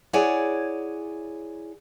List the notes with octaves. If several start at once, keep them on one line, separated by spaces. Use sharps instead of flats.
E4 G#4 C#5 D5 F#5 G#5